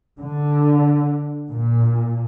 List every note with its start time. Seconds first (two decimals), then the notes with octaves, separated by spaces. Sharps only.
0.19 D3
1.51 A#2